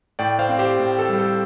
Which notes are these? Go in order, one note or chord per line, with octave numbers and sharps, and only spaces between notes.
A2 D5 G5
C5 F5
C4
G4 C5
A2
A4
G3
A4